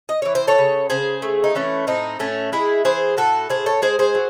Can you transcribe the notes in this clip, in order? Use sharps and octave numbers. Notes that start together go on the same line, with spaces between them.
D#5
E3 C#5
C5
A4 C#5
C#3
C#3 G#4 C5
A3
D#4
E3 A3 C#4
A2 C4 D#4
A2 A3 C#4
G#3 E4 G#4
E3 G#4 C5
A2 F#4 A4
A2 G#4 C5
A4 C#5
G#3 G#4 C5
G#4 C5
F#3